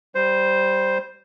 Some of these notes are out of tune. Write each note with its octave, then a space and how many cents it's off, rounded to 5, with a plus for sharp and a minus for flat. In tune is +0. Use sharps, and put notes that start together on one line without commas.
G3 -10 C5 +0